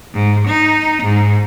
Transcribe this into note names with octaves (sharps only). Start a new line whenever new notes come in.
G#2
D#4
G#2